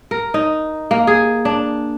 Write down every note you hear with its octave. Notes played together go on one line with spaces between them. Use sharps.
A#4
D#4
A#3
G#4
D4